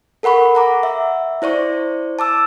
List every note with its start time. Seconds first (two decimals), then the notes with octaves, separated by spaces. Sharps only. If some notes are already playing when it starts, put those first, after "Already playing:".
0.23 A4 A#4 F#5 B5 C#6
0.55 F#5 A#5 D6
0.83 E5
1.42 E4 C5 D5 C#6
2.19 A5 D6 E6